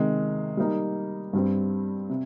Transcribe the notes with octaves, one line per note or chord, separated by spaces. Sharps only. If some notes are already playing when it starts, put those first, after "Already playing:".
Already playing: C3 D#3 G#3
G3 A#3 D#4
G2 G3 C4
C3